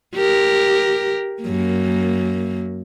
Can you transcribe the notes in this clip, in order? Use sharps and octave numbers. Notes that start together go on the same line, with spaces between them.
G4 A#4
F#2 A#3